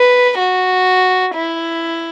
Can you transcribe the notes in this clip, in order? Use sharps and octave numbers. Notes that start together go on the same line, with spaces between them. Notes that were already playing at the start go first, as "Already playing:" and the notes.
Already playing: B4
F#4
E4